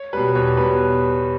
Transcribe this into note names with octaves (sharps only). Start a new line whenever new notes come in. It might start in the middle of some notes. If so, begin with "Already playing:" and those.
Already playing: C#5
B2 G3 B4
E2 C#5
B2 G3 B4